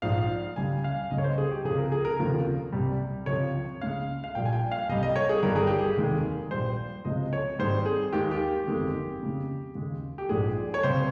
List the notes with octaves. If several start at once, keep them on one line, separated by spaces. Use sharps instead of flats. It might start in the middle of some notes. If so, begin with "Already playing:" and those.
A#1 G#2 F3 F5
C#2 C#3 G3 G#5
F5
C#2 C#3 G3 D#5
C#5
C5
G#4
G4
C#2 C3 F3 G#4
A#4
G#4
A#4
F1 D#2 C#3 F3
C2 C3 G3
C#2 C3 F3 C#5
C#2 C#3 G#3 F5
F5
A#1 A#2 G3 G5
G#5
G5
F5
C2 C3 G3 D#5
D#5
C#5
G#4
G1 G2 D#3 G3 A#4
G#4
G4
G#4
F1 D#2 D#3 G#3
A#1 A#2 G3 C5
C#2 C3 F3 G#3 D#5
C#5
G#1 G#2 G3 C5
G#4
D#2 D#3 G#3 G4
G4
G1 F2 D#3 G#3
F2 C#3 G#3
D#2 C#3 G#3
G4
A#1 G#2 F3 G#3 G#4
C#5
C#2 C3 G3 C5